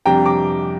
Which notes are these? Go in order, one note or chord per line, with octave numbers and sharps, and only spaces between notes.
F2 C3 G3 D4 G5 A#5
A#5 D6